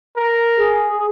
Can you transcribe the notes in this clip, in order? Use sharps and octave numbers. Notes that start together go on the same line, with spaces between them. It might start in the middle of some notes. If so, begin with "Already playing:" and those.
A#4
G#4